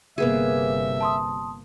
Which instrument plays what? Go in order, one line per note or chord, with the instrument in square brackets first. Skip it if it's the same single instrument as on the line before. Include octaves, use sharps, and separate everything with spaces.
[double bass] G1 C3 [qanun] A#3 B3 G#4 [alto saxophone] E5
[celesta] A5 C6 D#6